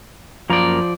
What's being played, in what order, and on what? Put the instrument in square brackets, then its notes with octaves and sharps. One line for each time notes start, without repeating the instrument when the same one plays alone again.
[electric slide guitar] F#2 A#3 A#5 [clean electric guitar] F3 D5